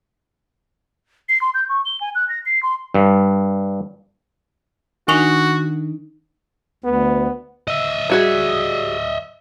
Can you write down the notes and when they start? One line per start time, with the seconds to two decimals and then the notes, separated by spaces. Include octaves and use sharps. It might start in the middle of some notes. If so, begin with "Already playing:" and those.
1.29 C7
1.41 C6
1.54 G6
1.69 C#6
1.85 G7
2.01 G#5
2.15 F#6
2.29 A#6
2.46 C7
2.63 C6
2.94 G2
5.08 D#3 D4 D#4 F#4 G#5 C#6 F7
6.84 D2 B3
7.68 D#5 E5
8.10 G3 F#4 G#4